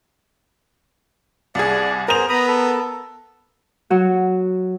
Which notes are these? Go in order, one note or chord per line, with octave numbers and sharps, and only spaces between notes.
C2 G#4 D5
B3 G#4 A#4 C5 F7
B3 A#5 B5 D#6
A4
F#3 F#4